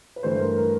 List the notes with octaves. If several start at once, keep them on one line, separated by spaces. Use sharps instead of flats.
B4
G2 E3 A3 C5
A#4
A#4